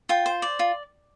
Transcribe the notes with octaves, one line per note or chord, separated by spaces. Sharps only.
F4 G5
C5
D5
F4